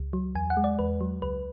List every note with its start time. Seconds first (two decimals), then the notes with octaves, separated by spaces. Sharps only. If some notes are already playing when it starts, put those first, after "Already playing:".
Already playing: C#2
0.13 F#3
0.35 E2 G#5
0.50 F#5
0.57 G#3
0.64 D5
0.79 E2 B4
1.01 F#3
1.22 C#2 B4